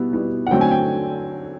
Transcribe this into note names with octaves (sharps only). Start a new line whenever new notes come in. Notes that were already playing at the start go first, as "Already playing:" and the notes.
Already playing: B2 G3 B3 E4
B2 G3 B3 E4
F#5
D3 F#3 A3 C4 G5
G#5
G5